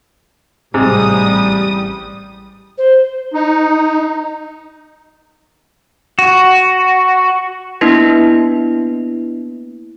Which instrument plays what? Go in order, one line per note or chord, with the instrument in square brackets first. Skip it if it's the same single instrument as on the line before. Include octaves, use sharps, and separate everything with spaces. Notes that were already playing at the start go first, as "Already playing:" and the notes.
[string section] A1 G3 D#6 [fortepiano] G#2 C3
[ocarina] C5
[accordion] D#4
[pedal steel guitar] F#4
[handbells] A#3 B3 D4 E4 B4